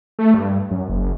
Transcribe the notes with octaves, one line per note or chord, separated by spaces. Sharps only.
A3
G2
F#2
F#1